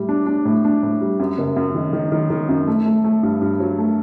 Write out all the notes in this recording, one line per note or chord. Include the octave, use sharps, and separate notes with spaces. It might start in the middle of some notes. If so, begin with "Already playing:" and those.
Already playing: A2 G3
D4
D4
A2
D4
A2
G3
F#2
F#1
F#2
D#3
D#3
D#3
D#3
F#2
A3
A3
A3
G2
G2
F#3
A3